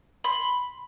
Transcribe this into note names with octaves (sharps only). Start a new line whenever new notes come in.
B5 C6